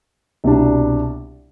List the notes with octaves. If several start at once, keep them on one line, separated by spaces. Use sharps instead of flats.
C2 B2 G3 D4